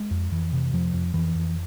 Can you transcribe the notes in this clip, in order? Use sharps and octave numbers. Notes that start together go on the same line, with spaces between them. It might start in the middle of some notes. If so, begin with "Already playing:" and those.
Already playing: G#3
F2
F2 E3
C3
F2 F3
F2
F2 E3
F2